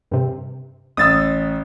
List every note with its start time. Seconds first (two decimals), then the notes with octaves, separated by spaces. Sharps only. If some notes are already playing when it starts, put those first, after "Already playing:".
0.11 G2 C3
0.97 A1 D#6 E6 A6